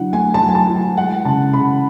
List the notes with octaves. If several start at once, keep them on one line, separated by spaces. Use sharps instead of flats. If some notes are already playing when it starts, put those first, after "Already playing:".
Already playing: D3 F#3 E4 F#5
A3 G#5
A5
F#3
G#5
A5
E4
G#5
G#3 F#5
C#3 A5
C#3 B5